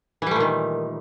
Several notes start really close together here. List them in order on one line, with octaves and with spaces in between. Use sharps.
E3 G3 A3 A#2 D#3